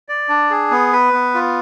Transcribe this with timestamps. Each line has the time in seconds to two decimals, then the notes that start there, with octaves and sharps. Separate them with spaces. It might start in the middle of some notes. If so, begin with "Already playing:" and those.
0.09 D5
0.29 D4
0.51 G#4
0.71 B3
0.92 B4
1.13 B3
1.34 F4